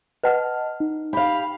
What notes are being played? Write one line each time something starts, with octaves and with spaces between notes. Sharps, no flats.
B4 D#5 F#5 A5 F6
D#4
G4 F5 B5